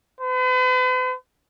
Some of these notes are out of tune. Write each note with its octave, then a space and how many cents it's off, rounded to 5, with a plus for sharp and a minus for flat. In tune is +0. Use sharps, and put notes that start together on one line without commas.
B4 +45